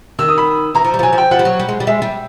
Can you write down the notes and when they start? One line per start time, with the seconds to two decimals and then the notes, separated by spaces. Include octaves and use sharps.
0.19 D#3 E6
0.29 D#6
0.38 B5
0.75 E3 A#5
0.85 F3
0.94 G3
0.99 F3
1.03 F#3 G#5
1.13 F3
1.18 G5
1.31 F3 F#5
1.39 G3
1.45 F#3
1.60 G3
1.69 G#3
1.80 G3
1.87 G#3 E5
2.02 G3